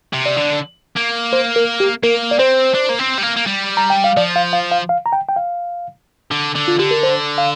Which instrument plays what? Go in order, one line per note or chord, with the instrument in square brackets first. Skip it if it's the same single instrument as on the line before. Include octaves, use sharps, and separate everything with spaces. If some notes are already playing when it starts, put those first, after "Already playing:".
[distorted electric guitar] C3
[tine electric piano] D5
[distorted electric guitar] D3
A#3
[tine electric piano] C5
A#4
G4
[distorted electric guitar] A#3 [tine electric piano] A#4
[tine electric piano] D5
[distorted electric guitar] C4 [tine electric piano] C5
[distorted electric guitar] D4
A#3
C4
G3
A#3
A#3
G3
[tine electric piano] A#5
G5
F5
[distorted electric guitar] F3 [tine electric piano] D5
[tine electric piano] F5
F5
F5
F5
A#5
G5
G5
F5
[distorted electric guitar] D3
D3
[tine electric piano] F4
[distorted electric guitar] D3 [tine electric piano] G4
[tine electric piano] A#4
C5
F5